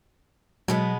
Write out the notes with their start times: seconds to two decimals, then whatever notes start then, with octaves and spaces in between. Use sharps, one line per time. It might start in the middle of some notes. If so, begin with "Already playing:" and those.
0.68 B2 F#3 G#3 B3